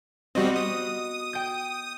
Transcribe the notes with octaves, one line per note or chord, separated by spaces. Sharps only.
G3 B3 C4 F#4 D#5
D#6
G5 G6